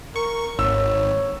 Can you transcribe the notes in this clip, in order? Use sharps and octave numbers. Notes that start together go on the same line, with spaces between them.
A#4 C#6
G#1 C#5 E6